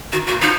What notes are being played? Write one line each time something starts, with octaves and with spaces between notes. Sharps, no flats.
D#3 F#4
F#4
A#2
F3 D#4